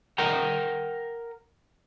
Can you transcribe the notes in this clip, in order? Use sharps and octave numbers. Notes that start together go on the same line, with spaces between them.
A#4 F#5 G5 A#5